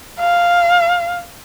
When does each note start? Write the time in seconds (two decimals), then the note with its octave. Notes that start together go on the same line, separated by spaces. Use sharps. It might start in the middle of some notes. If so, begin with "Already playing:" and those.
0.19 F5